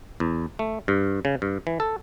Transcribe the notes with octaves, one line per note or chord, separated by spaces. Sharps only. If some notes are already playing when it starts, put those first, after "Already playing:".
E2
A3
G2
C#3
G2
E3
A4